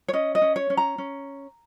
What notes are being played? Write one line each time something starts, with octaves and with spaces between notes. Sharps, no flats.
C#5
C#4 D#5
D#5
C#4
C#5
C#4
A#5
C#4